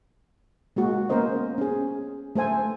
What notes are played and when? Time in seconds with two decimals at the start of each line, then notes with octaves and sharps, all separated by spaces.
0.76 G#3 A#3 F#4
1.09 A#3 B3 C#4 A#4 C5 D#5
1.58 C#4 G#4
2.36 A3 A4 C5 G#5